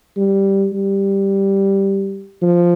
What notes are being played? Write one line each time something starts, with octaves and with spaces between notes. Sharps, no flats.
G3
G3
F3